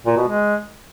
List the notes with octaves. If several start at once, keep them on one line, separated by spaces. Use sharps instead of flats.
A#2
B2
G#3